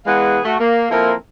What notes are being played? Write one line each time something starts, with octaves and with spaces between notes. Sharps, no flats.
E2 G#3 G#4 B4 F5 F#5
A3 F#4
A#3
F3 A#3 C4 E4 A4 A#4